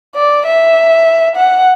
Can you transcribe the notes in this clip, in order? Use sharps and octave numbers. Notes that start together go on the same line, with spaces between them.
D5
E5
F#5